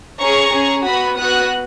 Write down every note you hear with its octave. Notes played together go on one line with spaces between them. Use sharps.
C#4 G#4 A#5 C#6
C#4 G#4
B3 F#4 B5 D#6
B3 F#4 D#6 F#6